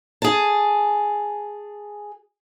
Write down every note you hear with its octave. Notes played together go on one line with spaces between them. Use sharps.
G#4 A5